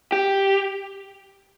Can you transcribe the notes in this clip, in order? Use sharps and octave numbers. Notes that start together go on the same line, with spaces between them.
G4